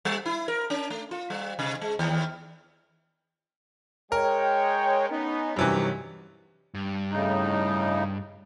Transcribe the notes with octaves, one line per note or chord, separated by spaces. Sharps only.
G3
E4
A#4
C#4
A3
F4
G3
C3
G#3
D#2
G#3 A#4 C#5 G5
B3 C#4 D#4
G2 C3 D#3 E3 F#3 C#4
G2
A2 C#3 D#4